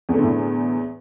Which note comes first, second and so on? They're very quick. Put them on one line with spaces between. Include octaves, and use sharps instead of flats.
E2 A3 D3 A2